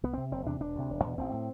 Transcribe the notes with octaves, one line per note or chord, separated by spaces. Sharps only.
C2 B3
C3 C4
F#1 C4
E2 C3 D4
E1 D4
D2 C3
E1
E2 B2
A1 C4
A2